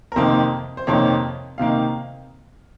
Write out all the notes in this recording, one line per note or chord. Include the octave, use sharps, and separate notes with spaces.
A#4
F2 C3 D#3 A#3 C5
C5
F2 C3 D#3 A#3 C#5
C3 D#3 A#3 F5